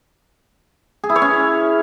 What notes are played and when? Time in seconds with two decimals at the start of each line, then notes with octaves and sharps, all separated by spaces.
1.04 G#4
1.10 E4
1.16 C#5
1.22 C#4